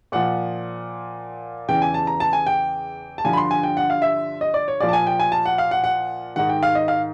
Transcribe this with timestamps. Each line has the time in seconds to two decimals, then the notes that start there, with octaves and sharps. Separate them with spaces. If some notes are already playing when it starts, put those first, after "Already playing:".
0.12 A#2 F3 F#5
1.68 E2 C#3 E3 G5
1.82 G#5
1.94 A5
2.07 A#5
2.20 A5
2.33 G#5
2.47 G5
3.18 A5
3.24 G2 D3 F3 G#5
3.33 B5
3.37 C6
3.51 G#5
3.63 G5
3.77 F#5
3.90 F5
4.02 E5
4.41 D#5
4.54 D5
4.68 C#5
4.80 A#2 F3 D5
4.89 A5
4.93 G#5
5.07 G5
5.20 G#5
5.32 A5
5.46 F#5
5.58 F5
5.71 F#5
5.84 F#5
6.36 G#2 D#3 F#5
6.49 G5
6.63 F5
6.75 D#5
6.88 F5